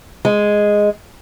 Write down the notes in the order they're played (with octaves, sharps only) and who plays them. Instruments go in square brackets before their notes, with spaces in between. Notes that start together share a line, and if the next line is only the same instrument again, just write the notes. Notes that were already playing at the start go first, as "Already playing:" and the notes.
[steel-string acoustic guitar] G#3